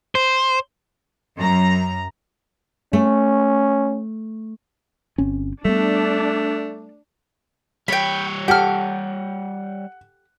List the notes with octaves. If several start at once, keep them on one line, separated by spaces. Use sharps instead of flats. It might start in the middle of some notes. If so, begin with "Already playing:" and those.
C5
F#2 A#5
A3 C#4
G1 C4 C#4
G3 A3 B3 D4
G3 C#5 G5 B5
G4 A4 F#5 G5 F6